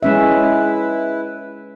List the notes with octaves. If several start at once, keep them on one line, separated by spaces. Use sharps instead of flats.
G#3 C#4 E4 B4 E5